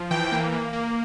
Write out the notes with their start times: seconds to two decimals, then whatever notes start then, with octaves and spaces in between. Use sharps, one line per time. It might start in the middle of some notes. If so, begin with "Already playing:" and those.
Already playing: F3
0.11 E3 G5
0.32 A#3
0.52 A#3
0.73 A#3